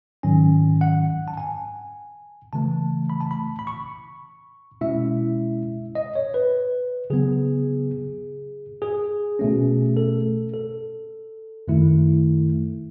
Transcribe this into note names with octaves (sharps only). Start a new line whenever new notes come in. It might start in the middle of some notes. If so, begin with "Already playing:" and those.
G#2 D#3 F#3 C#4 G#5
F#5
A5
G#5
C#3 E3 A3 A5
B5
A5
B5
B5
C#6
B2 G#3 C#4 E4 E5
D#5
C#5
B4
C#3 F#3 B3 G#4
G#4
B2 A3 C#4
A4
A4
F#2 D#3 A3 E4